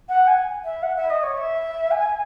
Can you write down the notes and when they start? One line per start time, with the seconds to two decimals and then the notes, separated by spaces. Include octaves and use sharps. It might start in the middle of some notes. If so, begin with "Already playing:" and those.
0.09 F#5
0.27 G#5
0.64 E5
0.82 F#5
0.96 E5
1.10 D#5
1.23 C#5
1.37 E5
1.91 G#5